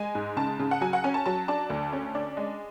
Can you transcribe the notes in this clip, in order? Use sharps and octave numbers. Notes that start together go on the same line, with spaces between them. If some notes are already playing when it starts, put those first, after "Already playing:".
Already playing: G#3 G#5
G#2
C#3 A5
C#3
F#5
F#3 G#5
F#5
C#4 G#5
A5
F#3 A5
D4 A5
D2
C#4
D4
G#3